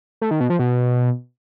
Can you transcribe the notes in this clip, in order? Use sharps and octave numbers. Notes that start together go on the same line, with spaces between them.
A3
D#3
B2
F3
B2